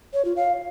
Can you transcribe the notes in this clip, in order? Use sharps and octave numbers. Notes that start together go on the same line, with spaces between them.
C#5
F4
F5